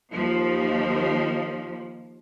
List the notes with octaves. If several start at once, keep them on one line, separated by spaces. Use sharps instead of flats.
D#2 F3